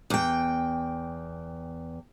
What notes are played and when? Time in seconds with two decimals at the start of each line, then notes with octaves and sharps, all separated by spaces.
0.10 E2 G5